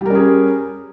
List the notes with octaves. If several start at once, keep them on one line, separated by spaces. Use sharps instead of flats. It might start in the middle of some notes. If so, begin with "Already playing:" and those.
G3 C#4 G#4 A#4